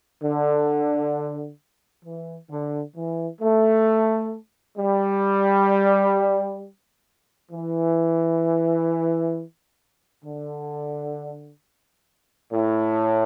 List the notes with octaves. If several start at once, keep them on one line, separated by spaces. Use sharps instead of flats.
D3
E3
D3
E3
A3
G3
E3
D3
A2